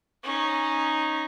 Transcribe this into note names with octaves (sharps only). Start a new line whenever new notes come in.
C#4 D#4